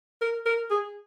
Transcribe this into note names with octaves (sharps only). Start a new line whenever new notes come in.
A#4
A#4
G#4